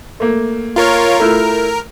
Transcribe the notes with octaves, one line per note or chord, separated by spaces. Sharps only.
A3 A#3
F4 A#4 C#5
A3 E4 F4 A#4